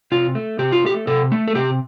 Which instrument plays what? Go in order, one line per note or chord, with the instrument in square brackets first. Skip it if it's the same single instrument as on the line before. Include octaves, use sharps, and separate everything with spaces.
[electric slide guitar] C3 F4
A3
C3 G4
F4
A3 G4
C3 A4
A3
A4
C3 G4